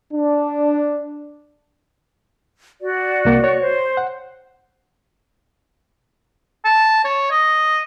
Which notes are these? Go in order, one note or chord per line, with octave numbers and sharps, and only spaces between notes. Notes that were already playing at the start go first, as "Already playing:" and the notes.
D4
F#4 D5
C2 A#3 A#4
C#5
C5
F#5
A5
C#5
D#5